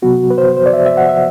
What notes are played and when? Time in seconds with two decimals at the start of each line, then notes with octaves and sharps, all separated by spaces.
0.02 C3 F#3 B3 F#4
0.30 B4
0.38 C5
0.57 C5
0.66 D5
0.73 E5
0.86 E5
0.97 F#5
1.09 E5